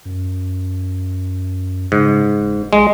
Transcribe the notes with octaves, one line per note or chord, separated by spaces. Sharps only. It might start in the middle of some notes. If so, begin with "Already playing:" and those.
F#2
G#2 C#3
F#1
B1 G#3